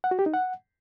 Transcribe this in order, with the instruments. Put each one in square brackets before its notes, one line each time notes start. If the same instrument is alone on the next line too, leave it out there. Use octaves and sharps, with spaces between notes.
[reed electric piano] F#5
F#4
G4
D#4
F#5